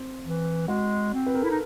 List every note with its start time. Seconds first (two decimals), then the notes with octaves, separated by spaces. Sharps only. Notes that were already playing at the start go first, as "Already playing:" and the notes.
Already playing: C4
0.22 E3
0.68 G#3 F#4
1.13 C4
1.27 B4
1.34 A#4
1.42 E4 A4
1.50 D#4